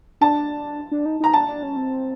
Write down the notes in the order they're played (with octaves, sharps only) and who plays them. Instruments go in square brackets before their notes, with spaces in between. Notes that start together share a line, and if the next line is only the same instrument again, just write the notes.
[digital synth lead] D4 [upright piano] A5
[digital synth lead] D4
D#4
[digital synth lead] D#4 [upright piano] A#5
[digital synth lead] D4 [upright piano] A5
[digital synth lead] D4
C#4
C4